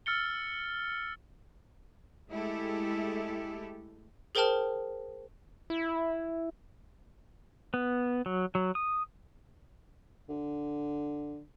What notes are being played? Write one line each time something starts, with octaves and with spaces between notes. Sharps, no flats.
E6 F6 A6 C#7 G7
G#3 A3 E4 G4 A4
G#4 A#4 C5 G5 A5 F6
E4
B3
F#3
F#3
D#6
D3